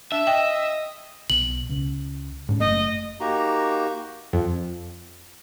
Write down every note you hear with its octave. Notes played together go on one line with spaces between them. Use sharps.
D4 E5
D#5 G5
B1 F#7
C#2
G#2 C#4 D4
F#1 A3 D#5
A#3 D#4 F#4 G4 A#5
F2